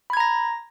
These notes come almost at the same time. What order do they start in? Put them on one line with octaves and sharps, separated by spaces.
B5 G#6 A#5 A#6